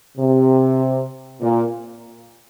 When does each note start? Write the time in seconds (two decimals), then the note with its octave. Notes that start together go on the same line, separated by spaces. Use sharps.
0.18 C3
1.41 A#2